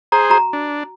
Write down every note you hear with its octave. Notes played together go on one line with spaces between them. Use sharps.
G#4 C5 A#5
F#4 A#5
D4